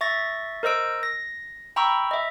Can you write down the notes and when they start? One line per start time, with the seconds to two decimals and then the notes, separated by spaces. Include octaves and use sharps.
0.01 E5 C#6 A6 A#6
0.63 A#4 C5 D#5 E6 D7
1.03 A#6
1.76 G5 A#5 B5 C#6 E6
2.11 D#5 E5